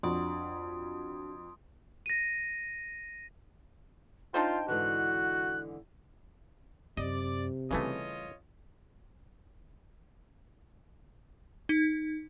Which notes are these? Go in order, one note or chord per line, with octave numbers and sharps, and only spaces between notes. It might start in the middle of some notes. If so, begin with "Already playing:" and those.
F2 D4 F#4 C6 D#6 D7
A#6 D#7
D4 D#4 F4 C5 G5
G#2 D3 E3 F#4 F#6
F#2 C3 D5 D#5
C#3 E3 G3 A3 C4 F4 C#5 D#5
D#4